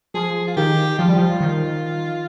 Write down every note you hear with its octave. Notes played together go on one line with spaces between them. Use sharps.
F3 G#4
F4
D#3 G4
F3 F4
G3
F3
D#3